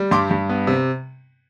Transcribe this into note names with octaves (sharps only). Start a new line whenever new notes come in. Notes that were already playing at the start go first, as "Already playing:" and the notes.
Already playing: G3
G2 C6 D6
G2
B3
C3